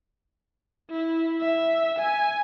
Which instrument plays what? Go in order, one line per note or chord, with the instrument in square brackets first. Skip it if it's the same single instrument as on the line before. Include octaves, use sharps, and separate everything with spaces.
[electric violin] E4
E5
G#5